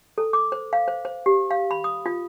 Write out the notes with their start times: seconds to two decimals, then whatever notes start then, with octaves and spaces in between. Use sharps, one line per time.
0.18 A4
0.33 D6
0.52 C5
0.73 F5
0.88 C5
1.05 C5
1.26 G4
1.51 F5
1.71 B5
1.84 D#6
2.06 F4